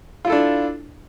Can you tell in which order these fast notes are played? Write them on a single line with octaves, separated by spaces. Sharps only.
F4 E4 A4 D4